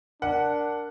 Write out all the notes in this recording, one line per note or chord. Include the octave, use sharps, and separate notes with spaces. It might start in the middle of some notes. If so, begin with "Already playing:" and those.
D4 A#4 F#5